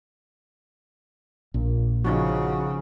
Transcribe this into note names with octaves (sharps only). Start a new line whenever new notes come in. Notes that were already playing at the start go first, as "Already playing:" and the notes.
A#1 A#2
C#3 F3 D#4 F#4